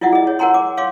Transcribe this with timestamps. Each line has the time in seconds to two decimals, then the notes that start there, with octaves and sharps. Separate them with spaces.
0.01 E4 F4 D5 E5 F#5
0.13 G#4 D#5
0.27 C#5
0.39 A#4 C#5 F#5 G#5 A#5 C6
0.54 D6
0.77 C#5 F5 C6 D6